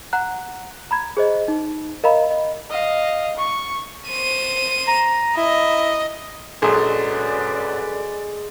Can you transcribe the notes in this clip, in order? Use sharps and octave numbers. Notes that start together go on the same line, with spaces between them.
F#5 A#5 F#6
A#5 B5 G#6
G#4 C5 D#5
D#4
A#4 D#5 F5 A#5 B5
D#5
D#5 F5
C#6
C5 D#7
A#5
E4 D#5
A#1 F#2 F#3 G#3 A4 B4 D5